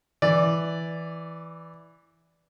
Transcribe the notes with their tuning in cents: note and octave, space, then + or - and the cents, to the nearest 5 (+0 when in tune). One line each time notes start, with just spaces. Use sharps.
E3 +0 D5 +0